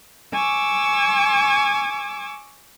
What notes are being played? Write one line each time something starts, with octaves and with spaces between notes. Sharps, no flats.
G#5 C#6 D6 E6